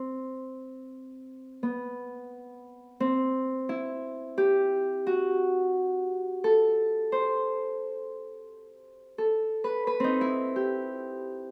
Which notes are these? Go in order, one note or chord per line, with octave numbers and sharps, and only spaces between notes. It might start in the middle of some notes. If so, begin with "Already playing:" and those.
Already playing: C4
B3
C4
E4
G4
F#4
A4
C5
A4
B4
B4
C4 D#4
E4
G4